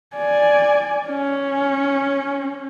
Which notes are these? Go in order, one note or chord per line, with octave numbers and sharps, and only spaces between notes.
D5 G#5
C#4